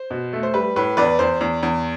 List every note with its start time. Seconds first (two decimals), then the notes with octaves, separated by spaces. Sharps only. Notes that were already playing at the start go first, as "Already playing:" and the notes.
Already playing: C5
0.11 B2
0.33 A3
0.43 C5
0.54 G3 B4
0.76 A2 B4
0.97 E2 B4 D5
1.19 E2 C5
1.41 E2
1.63 E2